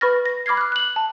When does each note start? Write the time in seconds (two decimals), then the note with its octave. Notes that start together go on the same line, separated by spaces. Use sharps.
0.01 B4 B5 C#6 F6 A6 A#6
0.26 A#6
0.46 B5 D6 F6 G#6 C7
0.57 F6 F#6
0.72 F#6 F#7
0.96 A5